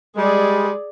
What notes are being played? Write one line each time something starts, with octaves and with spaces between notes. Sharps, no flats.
G3 G#3 G#4 D5